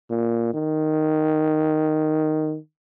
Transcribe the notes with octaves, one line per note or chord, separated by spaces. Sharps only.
A#2
D#3